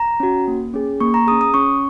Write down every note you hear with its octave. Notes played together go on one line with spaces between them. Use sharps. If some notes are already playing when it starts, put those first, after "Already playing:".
Already playing: A#5
C#4 F#4
A#3
C#4 G#4
A#3 C#6
A#5
C#4 G#4 D#6
D#6
C#4 C#6